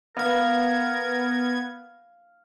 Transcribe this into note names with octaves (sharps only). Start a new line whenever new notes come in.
B3 A#4 F5 G#6